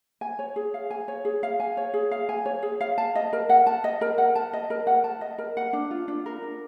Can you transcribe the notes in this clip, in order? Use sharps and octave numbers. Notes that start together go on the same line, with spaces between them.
G#5
C#5
G#4
F5
G#5
C#5
G#4
F5
G#5
C#5
G#4
F5
G#5
C#5
G#4
F5
A5
D#5
A#4
F#5
A5
D#5
A#4
F#5
A5
D#5
A#4
F#5
A5
D#5
A#4
F#5
D4
F4
D4
A#4
D4